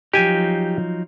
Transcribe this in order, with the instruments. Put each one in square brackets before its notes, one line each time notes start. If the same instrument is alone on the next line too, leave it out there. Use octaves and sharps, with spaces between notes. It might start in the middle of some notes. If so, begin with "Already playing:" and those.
[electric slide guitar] F3 F#3 D#4 [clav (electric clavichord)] G4 G#5